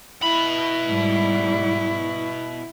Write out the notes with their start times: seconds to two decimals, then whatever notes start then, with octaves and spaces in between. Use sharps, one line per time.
0.22 B2 E4 B5
0.86 G#2 G3